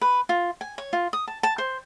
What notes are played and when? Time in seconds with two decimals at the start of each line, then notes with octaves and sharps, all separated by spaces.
0.01 B4
0.29 F4
0.61 G#5
0.78 C#5
0.93 F4
1.13 D#6
1.28 A5
1.43 A5
1.58 C5